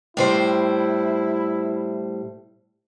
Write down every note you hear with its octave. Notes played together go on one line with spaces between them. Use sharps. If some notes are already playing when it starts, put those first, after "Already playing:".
A2 G3 E4 C5